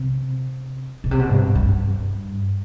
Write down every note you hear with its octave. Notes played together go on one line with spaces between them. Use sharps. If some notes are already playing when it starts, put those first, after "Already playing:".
Already playing: C3
B2
C3
B2
G2
G2